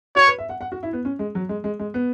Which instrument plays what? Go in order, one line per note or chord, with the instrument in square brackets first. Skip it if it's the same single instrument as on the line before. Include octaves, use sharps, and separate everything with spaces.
[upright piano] F#4 [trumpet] C#5
[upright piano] B4
E5
F#5
F#5
F#4
E4
B3
C#4
G#3
F#3
G#3
G#3
G#3
B3